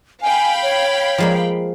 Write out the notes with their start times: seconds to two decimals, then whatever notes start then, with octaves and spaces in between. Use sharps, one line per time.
0.22 F5 G5 G#5 B5
0.63 C#5
1.18 F3 G#3 A#3